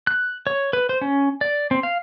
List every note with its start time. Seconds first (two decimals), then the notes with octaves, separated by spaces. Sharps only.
0.07 F#6
0.47 C#5
0.73 B4
0.89 C5
1.01 C#4
1.41 D5
1.71 C4
1.83 F5